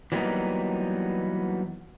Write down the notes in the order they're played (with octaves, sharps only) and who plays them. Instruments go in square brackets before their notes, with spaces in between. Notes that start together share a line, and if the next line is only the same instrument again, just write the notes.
[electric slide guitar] E3 F#3 G3 A#3 B3 D#4